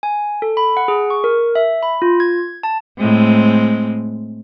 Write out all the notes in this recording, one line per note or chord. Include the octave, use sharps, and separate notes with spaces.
G#5
A4
B5
F#5
G#4
C#6
A#4
E5
B5
F4
G#6
A5
A2 G#3 C4